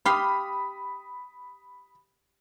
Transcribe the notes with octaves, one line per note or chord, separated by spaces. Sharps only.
G4 F5 B5 C6 D#6